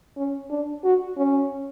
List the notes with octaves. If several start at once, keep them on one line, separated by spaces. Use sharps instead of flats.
C#4
D4
F#4
C#4